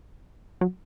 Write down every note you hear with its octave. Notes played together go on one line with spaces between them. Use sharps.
F#3